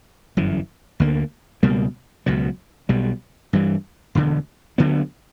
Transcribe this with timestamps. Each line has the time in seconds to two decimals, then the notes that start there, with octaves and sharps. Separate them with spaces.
0.37 G1 F#2 E3
1.00 D2 D3 A#3
1.63 C#2 B2 G3 A#3
2.26 C#2 B2 F#3
2.89 B1 B2 G3
3.53 G2 E3 G3
4.15 E1 D2 D3
4.78 D2 D3 F#3 B3